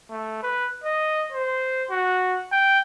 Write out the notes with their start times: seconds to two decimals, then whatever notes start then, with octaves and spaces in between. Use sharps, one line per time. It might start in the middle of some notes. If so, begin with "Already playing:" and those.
0.10 A3
0.42 B4
0.84 D#5
1.32 C5
1.90 F#4
2.52 G5